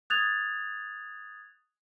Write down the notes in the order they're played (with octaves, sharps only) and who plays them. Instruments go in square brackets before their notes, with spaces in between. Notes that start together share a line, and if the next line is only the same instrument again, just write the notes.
[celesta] D#6 F#6 G#6 A6 F7